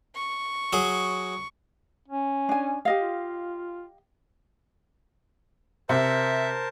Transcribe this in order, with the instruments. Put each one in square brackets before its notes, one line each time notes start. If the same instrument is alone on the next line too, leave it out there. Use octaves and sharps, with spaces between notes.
[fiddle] C#6
[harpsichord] F#3 G#4
[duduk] C#4
[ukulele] D4 G#5
G4 D#5 F5
[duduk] F4
[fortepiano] C3 [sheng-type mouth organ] A#4 C5 A5 [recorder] E5